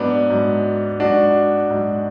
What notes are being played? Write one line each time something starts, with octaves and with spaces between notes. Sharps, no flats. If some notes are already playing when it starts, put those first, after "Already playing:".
Already playing: G#2 F#3 B3 D4
G#2 F#3
G#2 F#3 D4 F#4
G#2 F#3